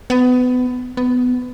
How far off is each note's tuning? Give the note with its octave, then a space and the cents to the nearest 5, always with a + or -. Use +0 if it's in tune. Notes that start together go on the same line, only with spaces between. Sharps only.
B3 +25
B3 +15